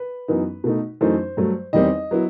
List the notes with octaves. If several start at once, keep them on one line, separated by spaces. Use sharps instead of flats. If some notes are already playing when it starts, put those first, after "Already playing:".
Already playing: B4
F#2 E3 B3 D#4
B2 A3 D#4
F#2 E3 A3 D#4 C5
G2 F#3 A3
E2 D#3 G3 C4 D#4 D#5
F#3 B3 E4